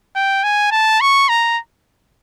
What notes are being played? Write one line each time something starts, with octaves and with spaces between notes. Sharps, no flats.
G5
G#5
A5
C#6
A#5